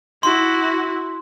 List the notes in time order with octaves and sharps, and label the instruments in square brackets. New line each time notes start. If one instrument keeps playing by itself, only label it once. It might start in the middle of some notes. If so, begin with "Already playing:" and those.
[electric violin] E4 F#4 [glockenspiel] C6